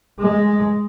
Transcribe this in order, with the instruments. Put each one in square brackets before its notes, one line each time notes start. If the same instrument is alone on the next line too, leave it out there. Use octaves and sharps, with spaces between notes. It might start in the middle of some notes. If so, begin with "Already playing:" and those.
[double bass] G#3